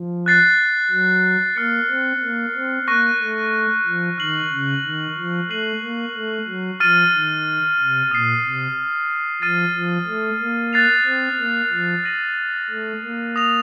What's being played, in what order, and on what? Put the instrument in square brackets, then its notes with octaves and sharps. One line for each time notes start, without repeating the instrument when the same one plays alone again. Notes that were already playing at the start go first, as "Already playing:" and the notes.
Already playing: [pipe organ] F3
[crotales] F#6 A6 C7
[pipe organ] F#3
[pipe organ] A#3 [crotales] F6 A6 C#7
[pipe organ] C4
A#3
C4
[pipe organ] A#3 [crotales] C#6 F#6 A#6
[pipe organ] A3
F3
[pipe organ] D#3 [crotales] F6 C7 F#7
[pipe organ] C#3
D#3
F3
[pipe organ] A3 [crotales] F#6 C7 D#7 F#7
[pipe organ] A#3
A3
F#3
[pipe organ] F3 [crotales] F6 A6 D#7
[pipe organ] D#3
C3
[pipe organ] A#2 [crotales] D#6 A6 C7
[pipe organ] C3
[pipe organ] F3 [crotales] F6 A6 D#7
[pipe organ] F3
A3
A#3
[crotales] F#6 A6 C7 F7
[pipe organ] C4
A#3
F3
[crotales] F6 A#6 D#7 F#7
[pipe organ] A3
A#3
[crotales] D#6 A#6 F7